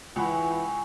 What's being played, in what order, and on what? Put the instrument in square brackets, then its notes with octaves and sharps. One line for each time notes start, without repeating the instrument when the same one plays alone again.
[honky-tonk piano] C#2 F#5 B5 [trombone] E3 [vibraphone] G#5 C#6